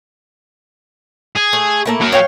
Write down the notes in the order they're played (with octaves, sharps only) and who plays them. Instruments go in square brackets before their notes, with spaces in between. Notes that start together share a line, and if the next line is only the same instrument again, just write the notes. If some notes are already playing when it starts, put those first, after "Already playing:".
[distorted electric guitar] G#4
[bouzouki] A3
A3 A#3 E4
[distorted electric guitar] F#3 A#4
[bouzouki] C#5 F5 G5